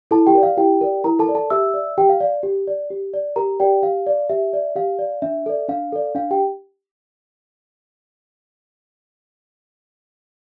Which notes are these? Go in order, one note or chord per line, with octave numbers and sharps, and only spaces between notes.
E4 A4 A5
G4 G5
A#4 D5
F5
E4 G4 G5
A#4 D5
E4 A#4 A#5
A4 A5
A#4 D5
A4 A5
G4 E5 E6
D5
G4 G5
F5
D5 F5
G4
D5
G4
D5
G4 A#4 A#5
G4 D5 G5
G4 F5
D5
G4 E5
D5
G4 F5
D5
D4 E5
A4 D5
D4 F5
A4 D5
D4 F5
G4 G5